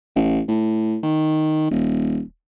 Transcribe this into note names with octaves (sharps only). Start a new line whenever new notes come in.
A1
A2
D#3
D#1